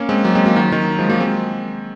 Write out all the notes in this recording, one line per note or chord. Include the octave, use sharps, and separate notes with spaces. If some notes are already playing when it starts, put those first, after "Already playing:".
Already playing: A#3 C#4
G#3 C4
F#3 A#3
G#3 C4
F#3 A#3
D#3 F#3
D#3 F#3
F3 G#3
F#3 A#3
G#3 C4